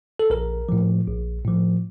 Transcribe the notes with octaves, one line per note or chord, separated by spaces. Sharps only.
A4
A#1 A#4
A2 F3
A#1
A2 F3